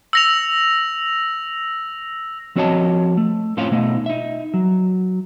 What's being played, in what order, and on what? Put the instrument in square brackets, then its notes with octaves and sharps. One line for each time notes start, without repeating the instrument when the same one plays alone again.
[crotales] E6 A#6 F7
[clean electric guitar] F3 C4 F#4 C#5 D#5 A5
A3
A2 C4 C#4 F4 C5 F5
B2 A3 D#4
D#4 E5
F#3